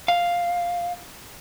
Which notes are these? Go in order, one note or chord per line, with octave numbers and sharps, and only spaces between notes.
F5